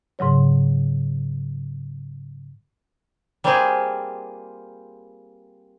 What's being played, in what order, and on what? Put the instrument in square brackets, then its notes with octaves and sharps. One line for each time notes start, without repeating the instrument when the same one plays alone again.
[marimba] G#2 C#3 F#3 C#5
[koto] G3 A#3 C4 F4 G4 G#4